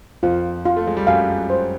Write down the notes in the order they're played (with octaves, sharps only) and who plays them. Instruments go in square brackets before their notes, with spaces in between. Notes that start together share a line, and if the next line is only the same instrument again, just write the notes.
[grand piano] F2 F3 [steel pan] F4
[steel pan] F4
[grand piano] A3
G#3
G3
[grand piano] F#2 F#3 [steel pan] F5
[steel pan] C5